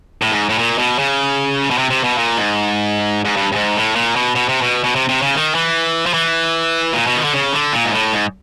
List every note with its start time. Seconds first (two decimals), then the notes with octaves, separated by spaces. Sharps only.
0.22 A2
0.32 G#2
0.49 A2
0.58 A#2
0.78 B2
0.99 C#3
1.71 B2
1.78 C3
1.90 C3
2.04 B2
2.18 A#2
2.37 G#2
3.25 G#2
3.37 G2
3.52 G2
3.56 G#2
3.77 A2
3.96 A#2
4.16 B2
4.35 B2
4.49 C3
4.62 B2
4.84 B2
4.96 C3
5.09 C3
5.22 C#3
5.35 D#3
5.55 E3
6.06 F3
6.14 E3
6.93 A#2
7.07 B2
7.17 D#3
7.24 D3
7.33 C#3
7.53 D3
7.72 A#2
7.85 G#2
7.93 A2
8.13 G#2